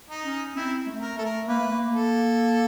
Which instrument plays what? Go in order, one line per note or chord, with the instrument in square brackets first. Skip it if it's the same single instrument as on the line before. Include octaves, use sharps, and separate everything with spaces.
[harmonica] D#4
[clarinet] C#4
[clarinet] C4 [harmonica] E4
[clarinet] A3
[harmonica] A#4
[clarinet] A3 [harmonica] A4
[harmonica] A#4
[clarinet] A#3 [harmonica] B4
[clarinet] A3
A#3
[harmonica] A4